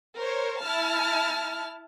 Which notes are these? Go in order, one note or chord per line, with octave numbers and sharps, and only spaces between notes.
A#4 C5 C#5
E4 A5 F6